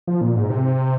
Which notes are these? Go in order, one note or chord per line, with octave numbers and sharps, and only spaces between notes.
F3
A#2
G#2
C3